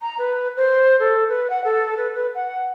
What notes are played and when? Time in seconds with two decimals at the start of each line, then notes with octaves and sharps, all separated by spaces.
0.01 A#5
0.18 B4
0.57 C5
0.99 A4
1.29 B4
1.50 F#5
1.64 A4
1.97 B4
2.15 B4
2.35 F#5